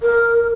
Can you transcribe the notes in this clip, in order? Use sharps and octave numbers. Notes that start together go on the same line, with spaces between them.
A#4